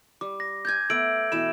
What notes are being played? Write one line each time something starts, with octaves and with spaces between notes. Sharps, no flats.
G3 D6
A#6
G5 G#5 G6 G#6
A3 B3 E6 D7 F#7
B2 E3 B5 E7